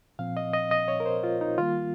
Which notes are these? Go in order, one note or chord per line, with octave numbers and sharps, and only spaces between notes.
A#2 F3 C4 F5
D#5
D#5
D#5
C#5
A#4
C5
F4
D#4
D#3 G3 A#3 F4